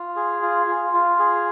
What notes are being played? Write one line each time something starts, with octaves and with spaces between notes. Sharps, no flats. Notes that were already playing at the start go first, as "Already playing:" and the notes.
Already playing: F4
G#4
F4
F4
F4
G#4